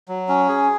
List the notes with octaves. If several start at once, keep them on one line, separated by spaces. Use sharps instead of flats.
F#3
C#4
G#4